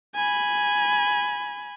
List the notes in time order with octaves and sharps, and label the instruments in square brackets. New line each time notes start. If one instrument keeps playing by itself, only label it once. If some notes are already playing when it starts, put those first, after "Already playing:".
[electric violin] G#5 B5